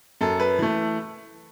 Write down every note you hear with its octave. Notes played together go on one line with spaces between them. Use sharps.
F#2 A4
B4
E3 A3